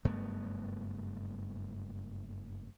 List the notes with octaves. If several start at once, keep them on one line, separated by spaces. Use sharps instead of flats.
F#1 G2 A3 B3